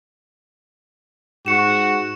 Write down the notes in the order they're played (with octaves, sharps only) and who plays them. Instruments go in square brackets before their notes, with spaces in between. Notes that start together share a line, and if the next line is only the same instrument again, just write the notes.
[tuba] G#2 [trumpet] F#4 [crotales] C#6 C#7 E7